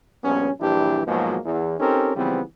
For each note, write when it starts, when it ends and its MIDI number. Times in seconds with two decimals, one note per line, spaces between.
0.23 0.50 34
0.23 0.50 43
0.23 0.50 59
0.23 0.50 61
0.60 1.02 34
0.60 1.02 43
0.60 1.02 52
0.60 1.02 62
0.60 1.02 64
0.60 1.02 67
1.07 1.37 44
1.07 1.37 47
1.07 1.37 53
1.07 1.37 54
1.07 1.37 56
1.07 1.37 58
1.45 1.76 40
1.79 2.13 60
1.79 2.13 61
1.79 2.13 63
1.79 2.13 67
1.79 2.13 69
1.79 2.13 70
2.16 2.41 49
2.16 2.41 52
2.16 2.41 53
2.16 2.41 55
2.16 2.41 59
2.16 2.41 60